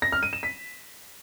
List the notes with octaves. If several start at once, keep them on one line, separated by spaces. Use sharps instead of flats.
A#6
F6
D#7
E7
B6